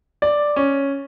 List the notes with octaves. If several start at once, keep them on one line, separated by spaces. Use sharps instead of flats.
D5
C#4